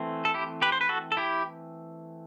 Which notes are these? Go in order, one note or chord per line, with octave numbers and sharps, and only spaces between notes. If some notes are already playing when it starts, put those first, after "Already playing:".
Already playing: E3 A3 C4
A4
E4 G4
G4 B4
C5
B4
F#4 A4
A4
E4 G4